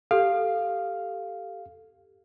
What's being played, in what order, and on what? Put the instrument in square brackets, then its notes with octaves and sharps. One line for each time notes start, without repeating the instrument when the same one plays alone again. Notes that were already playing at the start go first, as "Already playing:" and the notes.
[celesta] G4 A4 [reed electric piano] F5